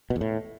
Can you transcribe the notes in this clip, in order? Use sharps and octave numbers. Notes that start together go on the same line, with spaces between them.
B2
E2
A2